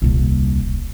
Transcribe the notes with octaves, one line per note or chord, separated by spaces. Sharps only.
D#1 C2